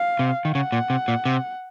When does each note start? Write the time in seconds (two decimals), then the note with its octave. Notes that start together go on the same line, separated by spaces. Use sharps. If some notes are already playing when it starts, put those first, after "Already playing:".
Already playing: F5
0.19 C3
0.45 D#3
0.55 C#3 F#5
0.72 A#2
0.90 C3
1.08 A#2
1.25 C3